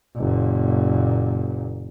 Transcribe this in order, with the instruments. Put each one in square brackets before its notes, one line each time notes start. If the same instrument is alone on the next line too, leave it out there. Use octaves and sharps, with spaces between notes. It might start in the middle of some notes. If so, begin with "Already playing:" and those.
[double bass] F#1 A#2